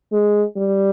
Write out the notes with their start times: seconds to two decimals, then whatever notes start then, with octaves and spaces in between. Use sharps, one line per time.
0.12 G#3
0.58 G3